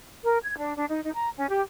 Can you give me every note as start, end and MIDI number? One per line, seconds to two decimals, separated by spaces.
0.24 0.38 70
0.43 0.57 92
0.57 0.75 62
0.77 0.85 62
0.89 1.00 63
1.03 1.12 63
1.15 1.29 82
1.36 1.46 61
1.49 1.61 67